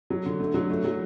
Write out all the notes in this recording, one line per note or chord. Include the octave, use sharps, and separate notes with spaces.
F#3
D3
A3
F#3
A3
F#3